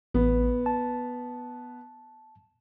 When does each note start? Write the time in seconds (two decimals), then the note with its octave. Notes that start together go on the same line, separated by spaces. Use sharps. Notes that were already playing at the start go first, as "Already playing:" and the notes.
0.14 A1 B3
0.66 A5